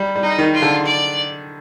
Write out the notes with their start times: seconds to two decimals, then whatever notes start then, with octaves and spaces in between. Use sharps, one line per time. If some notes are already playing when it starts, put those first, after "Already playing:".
Already playing: G3
0.15 G3
0.22 D#4
0.38 D#3
0.54 F4
0.62 D3
0.86 D5